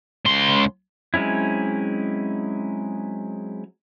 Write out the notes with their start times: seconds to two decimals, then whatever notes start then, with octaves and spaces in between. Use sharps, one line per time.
0.25 C#2 C6
1.14 F#3 G#3 C4 C#4 E4